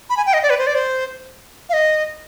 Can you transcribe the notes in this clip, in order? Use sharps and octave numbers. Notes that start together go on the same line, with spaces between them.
B5
G#5
G5
D#5
D5
B4
C5
D5
C5
F5
D#5